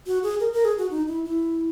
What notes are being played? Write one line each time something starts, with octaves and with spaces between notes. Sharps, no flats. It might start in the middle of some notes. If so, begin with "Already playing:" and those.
F#4
G#4
A#4
A#4
G#4
F#4
D#4
E4
E4